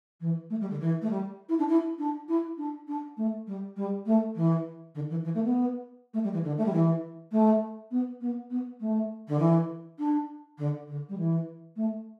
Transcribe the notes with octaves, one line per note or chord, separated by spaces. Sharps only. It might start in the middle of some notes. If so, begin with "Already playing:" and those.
E3
A3
G3
D3
E3
A3
G3
E4
D4
E4
D4
E4
D4
D4
A3
G3
G3
A3
E3
D3
E3
E3
A3
B3
A3
G3
E3
D3
A3
G3
E3
A3
B3
B3
B3
A3
D3
E3
D4
D3
D3
G3
E3
A3